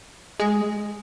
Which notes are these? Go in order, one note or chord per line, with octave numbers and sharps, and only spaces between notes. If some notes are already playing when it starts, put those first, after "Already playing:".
G#3